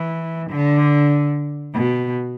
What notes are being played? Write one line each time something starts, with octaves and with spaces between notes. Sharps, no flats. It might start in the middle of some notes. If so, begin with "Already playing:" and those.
Already playing: E3
D3
B2